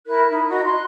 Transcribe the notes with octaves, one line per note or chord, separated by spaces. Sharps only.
E4 A#4 F#6
D#4 E4
F#4 D#5 A#5
C6 F#6